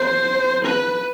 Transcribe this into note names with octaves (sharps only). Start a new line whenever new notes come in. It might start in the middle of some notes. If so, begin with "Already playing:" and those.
Already playing: C5
B4